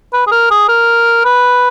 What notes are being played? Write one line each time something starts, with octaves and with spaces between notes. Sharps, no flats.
B4
G#4
A#4
G#4
A#4
B4